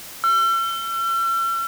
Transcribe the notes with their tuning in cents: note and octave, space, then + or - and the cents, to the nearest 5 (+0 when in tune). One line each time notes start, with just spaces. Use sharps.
E6 +45